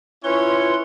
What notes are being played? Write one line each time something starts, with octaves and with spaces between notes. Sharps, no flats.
C#4 E4 F4 B4 C#5 C6